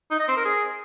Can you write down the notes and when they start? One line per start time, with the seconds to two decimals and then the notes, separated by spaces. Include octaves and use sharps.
0.11 D#4
0.20 D#5
0.28 C4
0.37 A#4
0.45 G#4